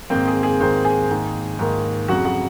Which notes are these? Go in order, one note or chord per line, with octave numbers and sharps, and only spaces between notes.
G#2 D#3 A#3 C4 C5
G#4
G#4
G#2 D#3 A#3 C4 C5
G#4 G#5
G#2 D#3 A#3
G#2 D#3 A#3
F2 C#3 F#3 F#4 F#5
F#4 F#5